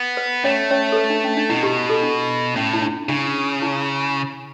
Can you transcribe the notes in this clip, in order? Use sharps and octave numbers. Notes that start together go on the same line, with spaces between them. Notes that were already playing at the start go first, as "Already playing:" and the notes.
Already playing: B3
B4
A3 C#4 C#5
C#4 C#5
A4
B4
D4
C#4
D4
B2 E4
G4
A4
D4
A2 C#4
E4
D4
C#3 D4
E4